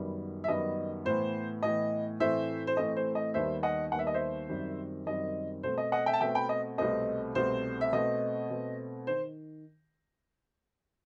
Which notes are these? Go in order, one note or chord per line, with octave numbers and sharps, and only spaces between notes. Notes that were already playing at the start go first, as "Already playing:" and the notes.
Already playing: F#2 D#3 G3 B3
E5
F#2 D#3 G3 B3 D#5
A2 E3 B3 C5
A2 E3 B3 D#5
A2 E3 A3 C4 C5 E5
C5
A2 E3 A3 C4 D#5
C5
D#5
D#2 D#3 G3 B3 C5 E5
D#5 F#5
D#2 D#3 G3 B3 F#5
E5
D#5
C5 E5
F#2 D#3 G3 C4
F#2 D#3 G3 C4 D#5
B2 A3 C4 C5
D#5
D#5 F#5
E5 G5
A5
B2 A3 C4 E5 G5
G5 B5
D#5
C2 B2 A3 C4 D#5
C2 B2 A3 C4 C5
E5
B2 A3 C4 D#5
B2 A3 C4
D#3 C5